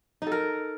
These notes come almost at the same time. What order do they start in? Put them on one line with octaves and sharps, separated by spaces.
D#4 A4 A#4